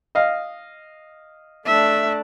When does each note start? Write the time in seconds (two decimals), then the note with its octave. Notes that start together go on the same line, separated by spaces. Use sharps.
0.15 D#5 F5
1.66 A3 D4 E5